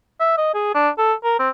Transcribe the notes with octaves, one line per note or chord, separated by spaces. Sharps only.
E5
D#5
G#4
D4
A4
A#4
C4